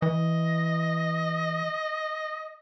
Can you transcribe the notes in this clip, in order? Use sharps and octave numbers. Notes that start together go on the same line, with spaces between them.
E3 D#5